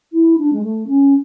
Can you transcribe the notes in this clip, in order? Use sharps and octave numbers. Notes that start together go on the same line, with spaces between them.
E4
D4
G#3
A3
C#4